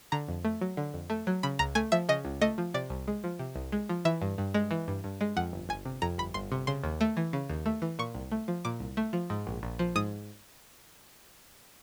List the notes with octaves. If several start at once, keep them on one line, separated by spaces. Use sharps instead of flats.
D3 A#5
F2
A3
F#3
D3
F2
A3
F#3
C#3 B5
C#2 A#5
A3 G#5
F3 E5
C#3 D#5
C#2
A3 D#5
F3
C3 D5
C2
G#3
F3
C3
C2
G#3
F3
E3 E5
G2
G2
G#3
E3
G2
G2
G#3
F2 F#5
G1
G1 G#5
C3
F2 A#5
G1 B5
G1 C6
C3
C#3 C6
D#2
A3
E3
C#3
D#2
A3
E3
A#2 C#6
C2
A3
F3
A#2 D6
C2
A3
F3
G#2
A#1
A#1
F3
G#2 D#6